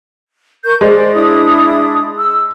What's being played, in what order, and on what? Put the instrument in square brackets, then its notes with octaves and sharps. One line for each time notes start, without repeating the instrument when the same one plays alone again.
[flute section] A#4 C#6 G6
[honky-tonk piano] G#3 [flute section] C5 D5
[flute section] D4 E4 D#6
E6